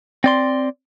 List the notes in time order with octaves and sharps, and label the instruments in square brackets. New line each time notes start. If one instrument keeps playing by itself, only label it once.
[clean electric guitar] C4 D5 C6